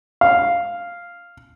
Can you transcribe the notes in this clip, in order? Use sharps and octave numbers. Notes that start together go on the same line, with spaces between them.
F5